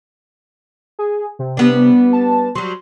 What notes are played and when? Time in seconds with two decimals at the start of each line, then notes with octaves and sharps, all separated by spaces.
0.99 G#4
1.39 C3
1.57 G3 B3 D4
2.13 A5
2.55 F#3 G3 C6